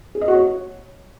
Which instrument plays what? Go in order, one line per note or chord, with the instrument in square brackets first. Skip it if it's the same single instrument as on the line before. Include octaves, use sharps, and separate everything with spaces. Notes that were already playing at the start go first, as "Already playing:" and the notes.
[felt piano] G#4
D#5
F#4
C#5